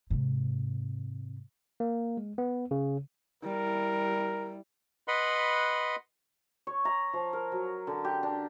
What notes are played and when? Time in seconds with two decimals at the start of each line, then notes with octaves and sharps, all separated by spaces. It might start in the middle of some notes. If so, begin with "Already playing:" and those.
0.10 G#2 C3
1.80 A#3
2.17 G#3
2.38 B3
2.71 C#3
3.44 G3 E4 A#4
5.08 B4 D#5 F#5 B5 C6
6.67 C#5
6.85 A#5
7.13 F3
7.33 A#4
7.52 F#3
7.87 D3
8.05 G4
8.23 D4